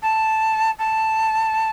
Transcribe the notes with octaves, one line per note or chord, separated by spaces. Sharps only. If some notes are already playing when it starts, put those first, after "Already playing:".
A5
A5